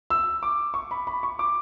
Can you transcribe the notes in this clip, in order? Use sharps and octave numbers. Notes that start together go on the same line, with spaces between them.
E6
D6
C#6
B5
B5
C#6
D6